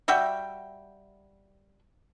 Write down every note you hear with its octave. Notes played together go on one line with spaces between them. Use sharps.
G3 F#4 E5 G5